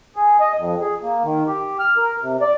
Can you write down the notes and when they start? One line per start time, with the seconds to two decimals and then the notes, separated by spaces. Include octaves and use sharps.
0.16 G#4
0.40 D#5
0.58 F2
0.81 G#4
1.02 A#3
1.23 D#3
1.48 G4
1.79 F6
1.97 A#4
2.22 C3
2.41 D5